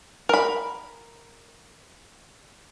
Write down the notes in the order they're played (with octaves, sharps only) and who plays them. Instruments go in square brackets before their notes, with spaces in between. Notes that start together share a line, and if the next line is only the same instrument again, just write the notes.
[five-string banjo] A#4 B5